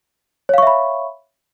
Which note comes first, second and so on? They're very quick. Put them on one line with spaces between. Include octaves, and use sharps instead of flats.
C#5 F5 C#6 E5 B5